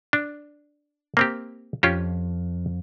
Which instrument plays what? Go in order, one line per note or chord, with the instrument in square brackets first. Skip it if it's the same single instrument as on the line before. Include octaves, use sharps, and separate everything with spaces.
[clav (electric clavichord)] D4
A#3 C4 G4
[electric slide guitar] F2 [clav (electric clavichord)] C#4 F4 G4